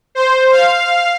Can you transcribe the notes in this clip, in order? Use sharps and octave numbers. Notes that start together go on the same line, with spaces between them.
C5
F5